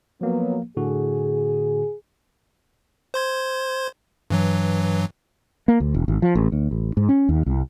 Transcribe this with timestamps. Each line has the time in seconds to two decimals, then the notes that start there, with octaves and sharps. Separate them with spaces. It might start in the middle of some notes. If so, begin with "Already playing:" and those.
0.21 F3 F#3 A#3 B3
0.77 A2 D3 F#4 G#4
3.14 C5 C6 G#6
4.30 G2 E3 F#3
5.68 A#3
5.80 D2
5.95 E1
6.08 G#1
6.22 F3
6.35 A1
6.52 D2
6.71 A1
6.97 G#2
7.09 C#4
7.29 D#2
7.46 C2